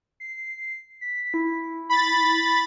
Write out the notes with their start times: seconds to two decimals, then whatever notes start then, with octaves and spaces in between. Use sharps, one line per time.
0.20 C7
1.01 B6
1.34 E4
1.90 B5 A6